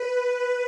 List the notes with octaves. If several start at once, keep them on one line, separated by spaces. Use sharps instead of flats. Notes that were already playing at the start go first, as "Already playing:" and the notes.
Already playing: B4